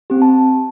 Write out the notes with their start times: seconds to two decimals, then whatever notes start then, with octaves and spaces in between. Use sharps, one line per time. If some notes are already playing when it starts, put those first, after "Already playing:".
0.10 C4 G4
0.22 A5